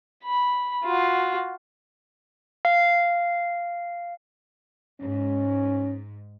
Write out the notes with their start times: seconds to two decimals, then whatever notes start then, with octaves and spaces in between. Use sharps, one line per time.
0.24 B5
0.83 F4 F#4
2.65 F5
5.00 G#2 C#4